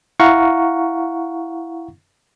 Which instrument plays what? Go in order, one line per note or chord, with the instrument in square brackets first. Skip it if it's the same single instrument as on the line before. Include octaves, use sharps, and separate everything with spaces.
[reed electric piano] E4 F5 F#5 A#5 C#6